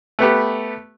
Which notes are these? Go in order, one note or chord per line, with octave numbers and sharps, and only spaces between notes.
A3 B3 G4 B4